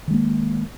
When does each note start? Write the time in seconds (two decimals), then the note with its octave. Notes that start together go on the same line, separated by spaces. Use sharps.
0.08 D#3
0.11 G#3
0.14 A#3